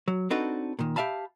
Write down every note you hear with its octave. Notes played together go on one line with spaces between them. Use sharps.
F#3
C4 D4 D#4 F#4 A4 B4
A#2 D#3
G4 E5 F5 A5 B5